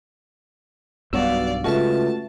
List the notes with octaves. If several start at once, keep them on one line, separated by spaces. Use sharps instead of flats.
B1 G2 B2 B3 F#4 D5 F5 E6
C#3 G#3 A3 F4 F#4 B4 E5 A5